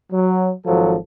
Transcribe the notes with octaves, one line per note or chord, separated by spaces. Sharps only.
F#3
G#1 F3 F#3 A4